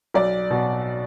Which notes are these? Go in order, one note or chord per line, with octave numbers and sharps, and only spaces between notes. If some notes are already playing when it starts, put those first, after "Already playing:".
B1 D5
B2